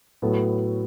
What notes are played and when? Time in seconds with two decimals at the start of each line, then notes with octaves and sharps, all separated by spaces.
0.22 A2 F#3 B3 F#4 A4